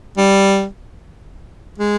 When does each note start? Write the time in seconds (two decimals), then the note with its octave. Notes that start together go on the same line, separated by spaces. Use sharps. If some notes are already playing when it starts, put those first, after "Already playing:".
0.17 G3
1.78 G#3